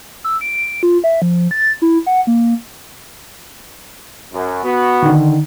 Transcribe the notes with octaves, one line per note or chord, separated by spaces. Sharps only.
E6
D7
F4
E5
F3
A6
E4
F#5
A#3
F#2
B3 F#4
D3 D#3